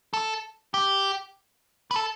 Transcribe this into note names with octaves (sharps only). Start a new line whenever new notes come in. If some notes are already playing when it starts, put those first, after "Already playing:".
A4
G4
B4
A4